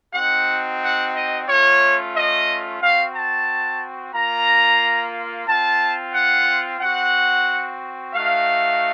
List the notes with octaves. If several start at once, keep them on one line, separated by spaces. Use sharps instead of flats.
C4 D#4 F#4 F#5
F#5
D#5
A3 C#4 F4 C#5
D#5
C4 F#4 F5
A5
A#3 F4 A#5
C4 F4 A5
F#5
C4 F#4 F#5
A3 D#4 F#4 F5